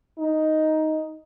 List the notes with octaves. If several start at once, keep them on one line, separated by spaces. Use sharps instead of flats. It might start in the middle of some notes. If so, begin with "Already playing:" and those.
D#4